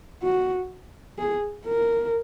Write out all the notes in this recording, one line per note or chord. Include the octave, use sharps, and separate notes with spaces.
F#4
G#4
A#4